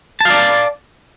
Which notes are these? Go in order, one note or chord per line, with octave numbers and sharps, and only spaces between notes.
D5 F5 A5